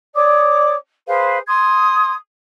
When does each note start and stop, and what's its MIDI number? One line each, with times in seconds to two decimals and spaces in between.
0.14 0.74 73
0.14 0.74 74
0.14 0.74 86
0.14 0.74 87
1.07 1.38 68
1.07 1.38 71
1.07 1.38 72
1.07 1.38 77
1.46 2.13 84
1.46 2.13 87
1.46 2.13 92